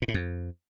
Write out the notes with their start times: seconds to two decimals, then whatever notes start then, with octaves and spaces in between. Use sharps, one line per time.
0.02 A#2
0.08 A2
0.14 F2